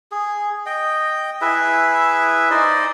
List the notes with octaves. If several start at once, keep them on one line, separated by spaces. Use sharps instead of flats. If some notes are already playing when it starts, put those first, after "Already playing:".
G#4
D#5 G5
E4 G#4 B4 E5
D#4 C5 D5 D#5